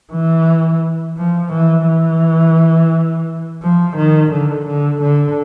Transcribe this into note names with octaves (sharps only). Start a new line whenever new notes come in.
E3
F3
E3
E3
F3
D#3
D3
D3
D3